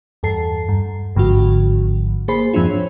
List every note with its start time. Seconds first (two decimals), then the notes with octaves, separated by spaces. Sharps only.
0.23 E2 G2 A4 A5 C7
0.69 G2
1.15 G#1 G#2 D3 F3 F#4
2.28 A#3 G#4 C5 B5 C7
2.54 F2 G#2 F3 C4 D4 F4
2.70 C#5